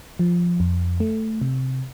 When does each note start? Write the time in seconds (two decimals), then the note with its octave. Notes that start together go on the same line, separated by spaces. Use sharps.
0.19 F3
0.60 F2
1.00 A3
1.41 C3